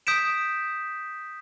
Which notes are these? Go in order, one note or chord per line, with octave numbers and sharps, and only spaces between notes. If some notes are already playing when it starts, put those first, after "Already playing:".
D#6 G6 B6 D7 E7